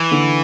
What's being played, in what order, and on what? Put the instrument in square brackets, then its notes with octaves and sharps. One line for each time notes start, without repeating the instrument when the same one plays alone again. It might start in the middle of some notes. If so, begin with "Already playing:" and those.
Already playing: [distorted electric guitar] E3
[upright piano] D3